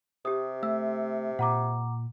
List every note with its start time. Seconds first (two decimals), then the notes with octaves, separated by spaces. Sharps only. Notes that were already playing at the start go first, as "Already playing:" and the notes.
0.25 C3 G4 D#6
0.63 A3 E5 E6
1.39 A#2 F#5 A#5 D6